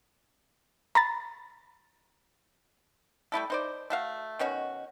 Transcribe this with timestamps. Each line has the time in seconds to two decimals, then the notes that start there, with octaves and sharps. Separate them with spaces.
0.95 A#5 B5 A6
3.32 G3 A3 E4 A4
3.50 D#4 C5 D5
3.90 A3 F#4 F5
4.39 B2 D#3 C#4 F#4